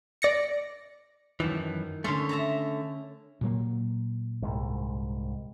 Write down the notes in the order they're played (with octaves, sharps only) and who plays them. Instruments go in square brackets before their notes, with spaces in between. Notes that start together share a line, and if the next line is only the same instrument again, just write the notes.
[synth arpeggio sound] D5 A#6 C#7
[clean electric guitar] F#2 E3 [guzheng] D#3 A5
[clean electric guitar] D3 A3 [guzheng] C#4 A4 C6
[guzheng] E5 A5 A#5
[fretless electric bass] A#2 F#3 A#3
[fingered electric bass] C2 G#2